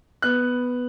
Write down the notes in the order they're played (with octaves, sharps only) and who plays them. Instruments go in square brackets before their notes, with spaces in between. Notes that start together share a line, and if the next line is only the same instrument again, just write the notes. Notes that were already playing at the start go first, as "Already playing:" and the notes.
[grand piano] B3 F#6